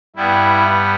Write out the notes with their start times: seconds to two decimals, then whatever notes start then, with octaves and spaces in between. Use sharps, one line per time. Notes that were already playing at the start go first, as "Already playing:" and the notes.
0.16 G2 G3 B3 E4